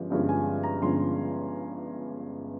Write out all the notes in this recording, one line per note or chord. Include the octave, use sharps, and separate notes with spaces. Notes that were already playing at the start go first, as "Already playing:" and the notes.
Already playing: G1 G2 F3 G#3 C#4
G1 G2 F3 G#3 C#4
G#5
A#5
G1 G2 F3 G#3 C#4 C6